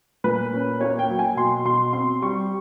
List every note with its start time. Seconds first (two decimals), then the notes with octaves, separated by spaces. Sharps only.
0.24 A#2 B4
0.53 C#4
0.81 A#3 C#5
0.99 G5
1.09 F#3
1.19 G#5
1.37 B2 C6
1.65 B2 C6
1.93 C4 C6
2.22 G3 C#6